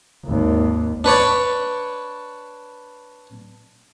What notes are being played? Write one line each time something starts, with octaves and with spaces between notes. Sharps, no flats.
G#1 D#2
D4 B4 C#5 D5